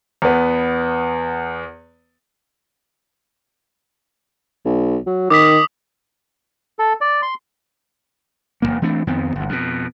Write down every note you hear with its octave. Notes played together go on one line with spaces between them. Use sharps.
E2 B3
B1
F#3
D#3 D6 D#6 B6
A4
D5
C6
E1 F#2 A#3
E3 A3 C4 D4
F2 D#3 B3 C4
G1 D2
F2 B2